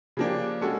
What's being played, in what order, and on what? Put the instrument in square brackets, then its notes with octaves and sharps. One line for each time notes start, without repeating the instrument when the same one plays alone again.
[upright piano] C#3 F3 A#3 D4 G4
G#3 C#4 F#4 A4